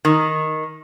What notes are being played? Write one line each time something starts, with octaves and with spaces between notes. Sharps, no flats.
D#3